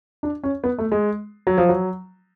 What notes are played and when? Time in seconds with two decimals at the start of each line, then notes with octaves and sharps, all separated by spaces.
0.23 D4
0.43 C#4
0.64 B3
0.78 A3
0.92 G#3
1.47 F#3
1.58 F3
1.69 F#3